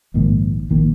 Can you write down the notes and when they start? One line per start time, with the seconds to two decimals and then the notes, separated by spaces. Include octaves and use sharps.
0.14 A#1 G#2 D#3 A#3
0.70 A#1 D#3 A#3